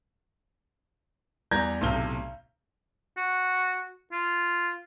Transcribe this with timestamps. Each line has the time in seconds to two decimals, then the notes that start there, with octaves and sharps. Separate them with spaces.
1.51 E2 G3 A#5 G6 G#6 A#6
1.81 B1 A2 C3 F6 G7
3.17 F#4
4.13 F4